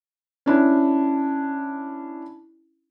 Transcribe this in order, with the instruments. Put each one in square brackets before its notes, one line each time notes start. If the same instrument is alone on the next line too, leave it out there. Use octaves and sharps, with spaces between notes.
[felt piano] C#4 D4 E4